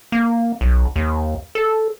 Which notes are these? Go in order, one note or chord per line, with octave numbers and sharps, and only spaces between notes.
A#3
B1
D#2
A4